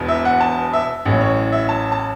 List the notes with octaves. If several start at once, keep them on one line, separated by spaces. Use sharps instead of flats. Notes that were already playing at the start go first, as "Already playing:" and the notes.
Already playing: E1 E2 B2
E5
F#5
A5
E5
A1 A2 F#3
C#5
E5
A5
A5